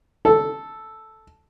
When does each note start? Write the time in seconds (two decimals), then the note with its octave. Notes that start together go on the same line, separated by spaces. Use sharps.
0.25 A4